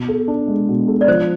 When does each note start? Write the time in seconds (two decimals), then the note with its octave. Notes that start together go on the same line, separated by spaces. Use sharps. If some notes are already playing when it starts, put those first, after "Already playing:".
Already playing: B2
0.08 A4
0.28 D4
0.48 G#3
0.69 B2
0.88 A4
1.01 D5
1.08 F3 C5